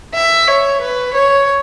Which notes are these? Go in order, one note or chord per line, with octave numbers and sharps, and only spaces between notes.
E5
C#5
B4
C#5